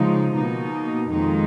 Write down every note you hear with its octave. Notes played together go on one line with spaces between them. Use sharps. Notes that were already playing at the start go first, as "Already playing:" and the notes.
Already playing: C#3 F3 G#3 D#4
B2 A#3 D#4
F2 D#3 G#3 D#4